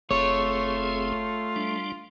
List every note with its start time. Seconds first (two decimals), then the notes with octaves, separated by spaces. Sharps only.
0.11 F#1 A3 C4 F4 G#4 C#5
1.56 G3 D4